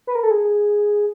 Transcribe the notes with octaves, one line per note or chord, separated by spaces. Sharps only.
B4
A#4
A4
G#4